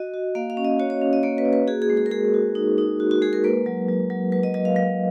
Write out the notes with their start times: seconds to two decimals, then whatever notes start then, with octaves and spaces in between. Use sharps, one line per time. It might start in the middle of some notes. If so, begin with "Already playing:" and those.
Already playing: F#4 D#5
0.14 F#4
0.35 A#3 F5
0.50 F5
0.57 C#4
0.64 D#5
0.79 F#4 C#5
0.90 C#5
1.01 C#4
1.13 D#5
1.23 A#3 C#5
1.38 B4
1.45 A#3
1.53 B4
1.68 F#4 G#4
1.82 G#4
1.90 G#3
1.97 G#4
2.06 A#4
2.11 G#3 G#4
2.34 F#4
2.55 D#4
2.78 D#4
3.00 F#4
3.11 F#4
3.22 G#3 G#4
3.33 A#4
3.44 A#3 B4
3.66 F#3
3.88 F#3
4.10 F#3
4.32 F#3 B4
4.43 D#5
4.54 F#3 D#5
4.65 F5
4.76 F#3 F5